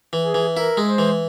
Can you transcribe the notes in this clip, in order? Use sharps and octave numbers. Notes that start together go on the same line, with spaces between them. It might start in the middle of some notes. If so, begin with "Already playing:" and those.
E3
G#4
E3
E4 A#4
G#3
C5
E3